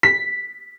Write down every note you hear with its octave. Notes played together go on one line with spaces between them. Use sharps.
B6